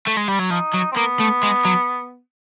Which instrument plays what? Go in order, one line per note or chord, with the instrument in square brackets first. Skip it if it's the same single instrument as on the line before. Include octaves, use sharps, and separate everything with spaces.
[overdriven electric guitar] A3
G#3
G3
F#3
[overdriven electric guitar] F3 [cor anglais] D#4
[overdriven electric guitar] F#3
[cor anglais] C4
[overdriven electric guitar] A#3 [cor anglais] B3
[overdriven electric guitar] A3
G#3
F#3